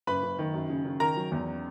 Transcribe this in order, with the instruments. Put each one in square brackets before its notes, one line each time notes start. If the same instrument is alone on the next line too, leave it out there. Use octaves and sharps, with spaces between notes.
[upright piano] F#1 [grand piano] B4 B5
[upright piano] F#1
D#3
F#2
C#3
C#3
[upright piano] D#3 [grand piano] A#4 A#5
[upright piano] F#3
E2